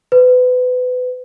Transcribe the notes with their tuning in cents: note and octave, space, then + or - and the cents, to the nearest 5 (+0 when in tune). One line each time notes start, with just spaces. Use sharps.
B4 +30